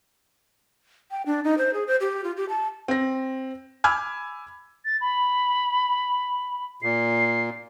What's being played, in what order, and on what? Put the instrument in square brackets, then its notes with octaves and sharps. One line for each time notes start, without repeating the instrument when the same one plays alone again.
[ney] G5
D4
D#4
C5
G#4
C5
G4
F4
G4
A5
[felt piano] C4 A#6
G#5 B5 D6 E6 F6 G#6
[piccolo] A6
B5
[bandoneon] A#2 [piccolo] C7